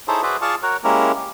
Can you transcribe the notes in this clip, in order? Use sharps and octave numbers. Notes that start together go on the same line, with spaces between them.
D#4 E4 G#4 A4 C5 C#5
F#4 G#4 B4 C5 D5 E5
F4 G#4 D5 F5 A5 C#6
F#4 A#4 C#5 F#5
G#3 A#3 C#4 E4 G4 A#4
G4